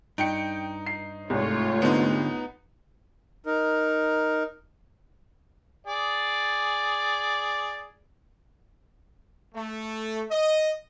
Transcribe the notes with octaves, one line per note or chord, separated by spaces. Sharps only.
G2 D#4 G5 C#7 D7
C7
C2 G#2 A3 F4 C#5
D3 B3 C4 D#4
D#4 A#4
G#4 D5
A3
D#5